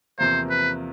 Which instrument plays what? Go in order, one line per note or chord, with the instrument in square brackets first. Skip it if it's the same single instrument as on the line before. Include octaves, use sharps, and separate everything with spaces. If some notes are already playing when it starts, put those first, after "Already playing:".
[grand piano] E2 C3 F3 A#3 [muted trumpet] C5
[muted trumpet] B4